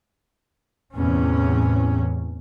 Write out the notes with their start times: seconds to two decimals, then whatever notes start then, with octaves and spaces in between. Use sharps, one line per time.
0.95 E2 A2 C3 C#4